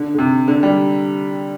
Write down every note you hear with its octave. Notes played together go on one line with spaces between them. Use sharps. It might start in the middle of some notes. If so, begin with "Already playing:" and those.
Already playing: D3
D3
C3
D3
G3